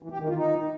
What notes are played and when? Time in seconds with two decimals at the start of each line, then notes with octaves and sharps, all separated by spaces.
0.03 E3
0.11 G4
0.20 D#3
0.29 F4
0.37 D#4